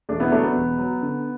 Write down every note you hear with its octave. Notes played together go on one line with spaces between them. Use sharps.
E1 A3 D4
B3 E4
F#3 A3 D4
B3
E1
F#3
D3